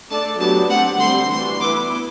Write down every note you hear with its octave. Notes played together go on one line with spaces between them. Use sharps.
A3 D4 A4 D5 A5
F#3 B3 D4 G4 A5
A3 C4 G4 F#5
D3 G3 C4 C6
E3 A3 D4 F#4 C6
B3 E4 B4 D6